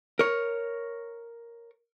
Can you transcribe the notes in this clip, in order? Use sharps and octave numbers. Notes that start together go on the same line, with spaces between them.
A#4 C#5